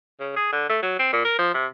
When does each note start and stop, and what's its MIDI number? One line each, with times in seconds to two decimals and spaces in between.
0.20 0.34 49
0.36 0.48 68
0.52 0.69 50
0.69 0.79 57
0.82 0.98 54
0.99 1.10 60
1.12 1.23 46
1.25 1.36 70
1.39 1.50 53
1.54 1.66 48